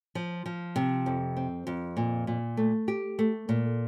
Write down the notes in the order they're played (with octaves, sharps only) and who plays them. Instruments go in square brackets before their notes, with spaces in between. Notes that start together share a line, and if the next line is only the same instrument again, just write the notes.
[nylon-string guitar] F3
F3
C3
F2
C4
F2
A#2
A#2
A3
G4
A3
A#2